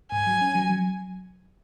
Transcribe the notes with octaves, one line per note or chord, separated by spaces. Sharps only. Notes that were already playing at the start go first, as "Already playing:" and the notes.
G#2 G#5
F#3
C#4
F#3
F#3